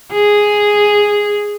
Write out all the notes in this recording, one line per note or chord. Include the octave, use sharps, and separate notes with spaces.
G#4